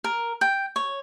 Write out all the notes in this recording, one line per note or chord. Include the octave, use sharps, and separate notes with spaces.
A#4
G5
C#5